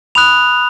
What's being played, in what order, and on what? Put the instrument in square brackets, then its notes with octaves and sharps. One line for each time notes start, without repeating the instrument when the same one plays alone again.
[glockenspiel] B5 D#6 F#6 F7